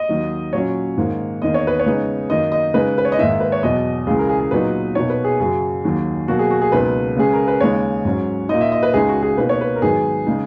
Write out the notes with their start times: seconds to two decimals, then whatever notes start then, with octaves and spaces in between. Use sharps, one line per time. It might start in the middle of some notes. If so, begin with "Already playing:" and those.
Already playing: D#5
0.09 D#2 D#3 F#3
0.53 A#2 F#3 C#4 C#5
0.97 G#2 D#3 A#3 D#4
1.42 E2 D#3 A#3 D#5
1.54 C#5
1.67 B4
1.80 C#5
1.86 C#3 G#3 B3 D#4
2.30 F#2 D#3 A#3 D#4 D#5
2.52 D#5
2.74 C#3 G#3 D#4 B4
2.98 B4
3.05 C#5
3.12 D#5
3.19 G#2 D#3 A#3 D#4 E5
3.40 B4
3.52 C#5
3.63 E2 B2 F#3 D#5
4.07 C#2 C#3 E3 G#3 G#4
4.18 A#4
4.29 G#4
4.40 G#4
4.51 A#2 F#3 B3 D#4 B4
4.95 B2 A#3 D#4 C#5
5.10 B4
5.25 G#4
5.40 F#2 C#3 F#3 G#4
5.85 D#2 D#3 F#3
6.28 B2 F#3 A#3 F#4
6.39 G#4
6.50 F#4
6.62 G#4
6.72 C#2 B2 F#3 A#3 D#4 B4
7.16 C#3 G#3 C#4 G#4
7.33 A#4
7.48 B4
7.61 D#2 C#3 G#3 D#4 C#5
8.05 G#2 F#3 C#4
8.49 A#2 A#3 D#4 D#5
8.61 E5
8.72 D#5
8.83 B4
8.94 C#2 C#3 G#3 D#4 G#4
9.09 F#4
9.23 G#4
9.38 B2 A#3 D#4 B4
9.49 C#5
9.61 B4
9.76 A#4
9.82 G#2 D#3 F#3 B3 D#4 G#4
10.27 C#3 G#3 D#4